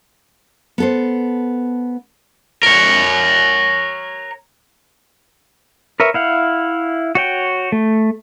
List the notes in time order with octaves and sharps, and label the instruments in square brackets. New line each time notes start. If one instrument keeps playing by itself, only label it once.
[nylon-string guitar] B3 A4 C5
[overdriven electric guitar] A#4 C#5
[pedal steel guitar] A#4 B4 C#5 E5
E4 F5 F#5
F#4 C#5 G5
A3